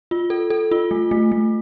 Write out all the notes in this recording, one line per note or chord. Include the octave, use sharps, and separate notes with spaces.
F4
A4
A4
F4
A3
A3
A3